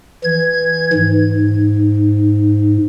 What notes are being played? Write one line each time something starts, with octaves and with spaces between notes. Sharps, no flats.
E3 G#6
G#2